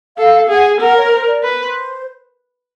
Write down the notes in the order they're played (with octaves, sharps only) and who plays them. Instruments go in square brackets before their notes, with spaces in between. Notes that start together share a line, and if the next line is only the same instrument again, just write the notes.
[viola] A4 [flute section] F5
[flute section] F5
F5
[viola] G#4 [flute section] F#5
[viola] A#4 [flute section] F#5
[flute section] C#5
C5
D5
[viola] B4
[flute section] C5